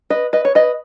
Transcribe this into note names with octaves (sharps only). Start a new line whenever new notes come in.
B4 D#5
B4 D#5
C#5
B4 D#5